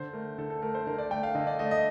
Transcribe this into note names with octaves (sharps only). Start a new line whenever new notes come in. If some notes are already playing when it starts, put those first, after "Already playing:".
Already playing: D3 C5
A3 A#4
D3 A4
A4
A3 A#4
C5
D3 A#4
D5
A3 G5
F5
D3 D#5
D5
A3 D#5
D#5